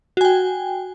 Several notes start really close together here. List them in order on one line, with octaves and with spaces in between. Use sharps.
F#4 G#5 G5